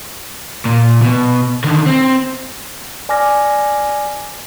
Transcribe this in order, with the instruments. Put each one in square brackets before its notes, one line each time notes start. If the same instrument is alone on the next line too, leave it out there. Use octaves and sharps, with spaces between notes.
[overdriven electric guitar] A#2
B2
D3 D#3
C4
[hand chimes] D5 G#5 D6 F6 A#6